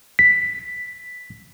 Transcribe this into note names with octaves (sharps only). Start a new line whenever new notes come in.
B6